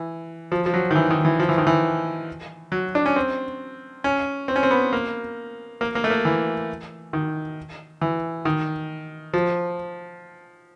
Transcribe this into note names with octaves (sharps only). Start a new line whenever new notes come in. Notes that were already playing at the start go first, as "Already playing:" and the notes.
Already playing: E3
F3
F3
F#3
D#3
E3
D#3
E3
F3
E3
D#3
E3
F#3
D4
C#4
C4
C#4
C4
C#4
C4
B3
A#3
A#3
A#3
A3
A#3
E3
D#3
E3
D#3
F3